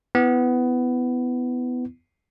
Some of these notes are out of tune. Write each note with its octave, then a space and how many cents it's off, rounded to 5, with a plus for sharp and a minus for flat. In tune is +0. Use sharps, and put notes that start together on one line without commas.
B3 +15 E4 +0